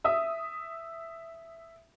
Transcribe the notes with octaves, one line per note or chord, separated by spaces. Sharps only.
E5 D#6